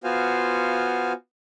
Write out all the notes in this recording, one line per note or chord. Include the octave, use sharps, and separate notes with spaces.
B3 F4 F#4 C5 F5 G#5